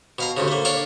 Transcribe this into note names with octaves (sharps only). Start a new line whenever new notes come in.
B2 F5 A#5
D2 G2 C#3
A3 A#3
D4 C#5 F5 D6